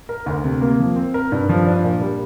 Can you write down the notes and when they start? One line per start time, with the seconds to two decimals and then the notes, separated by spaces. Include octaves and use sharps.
0.09 A#4
0.26 D2
0.44 C3
0.61 A#3
0.80 F3
0.96 C4
1.14 A#4
1.32 G2
1.49 F3
1.67 D4
1.84 A#2
2.01 G3